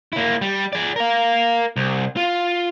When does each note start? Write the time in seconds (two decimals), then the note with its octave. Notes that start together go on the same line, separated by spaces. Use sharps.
0.13 A#3 E4
0.41 G3
0.73 G#4 D5
0.96 A#4 F5
1.76 C2
2.17 F4